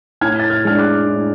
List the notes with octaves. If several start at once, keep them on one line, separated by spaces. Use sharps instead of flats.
A2 F6 G#6
A6
F6 G#6
G#3 D4 F6
D6 F#6
A2